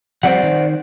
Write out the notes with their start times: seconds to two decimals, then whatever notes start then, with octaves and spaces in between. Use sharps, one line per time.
0.23 F3 G3 C4 C5 D5 F#5
0.43 D#3